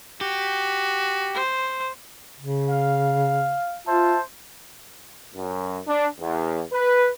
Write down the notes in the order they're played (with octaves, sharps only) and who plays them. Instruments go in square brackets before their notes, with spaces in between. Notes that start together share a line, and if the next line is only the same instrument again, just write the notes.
[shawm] F#4 [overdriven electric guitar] G4
[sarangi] C5
[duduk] C#3
[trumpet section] F5
[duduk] F4 [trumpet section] C5 E5 A5
[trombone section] F#2
D4
E2
B4